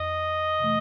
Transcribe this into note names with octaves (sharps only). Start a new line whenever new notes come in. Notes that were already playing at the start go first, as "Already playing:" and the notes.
Already playing: F2 D#5
C3 E3 A3